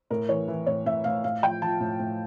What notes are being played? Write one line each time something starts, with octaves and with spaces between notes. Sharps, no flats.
A2 A#4
E3 C#5
E3
A2 C#5
A2 E5
A2 F5
A2 F5
F3 G5
F3 A5
A2
A2